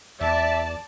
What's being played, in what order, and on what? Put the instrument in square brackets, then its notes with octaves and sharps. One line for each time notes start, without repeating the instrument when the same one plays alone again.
[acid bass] E2 [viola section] D5 A5 [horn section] E5